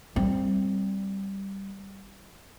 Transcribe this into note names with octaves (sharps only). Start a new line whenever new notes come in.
G3 C4